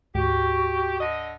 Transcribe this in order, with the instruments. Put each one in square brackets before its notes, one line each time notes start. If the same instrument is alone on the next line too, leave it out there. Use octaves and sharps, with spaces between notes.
[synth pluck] D2 G#2 [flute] F#4 [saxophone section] G4
[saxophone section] D3 D#5